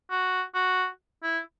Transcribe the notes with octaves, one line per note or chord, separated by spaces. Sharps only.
F#4
F#4
E4